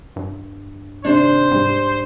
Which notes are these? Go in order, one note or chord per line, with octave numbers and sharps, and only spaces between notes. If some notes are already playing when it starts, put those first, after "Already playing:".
G2
D#2 C3 D4 G4 C5
G#2 G3 G4